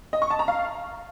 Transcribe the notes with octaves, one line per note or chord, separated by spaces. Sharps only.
D#5
C#6
A5
A#5
F5